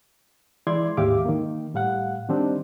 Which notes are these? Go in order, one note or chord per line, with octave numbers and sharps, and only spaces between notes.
E3 G#3 E4 D5 C6 G#6
D#2 G#2 G4 E5 F5 D6
D#3 A#3
A2 G3 F5 F#5
D#3 G3 C4 D4 D#4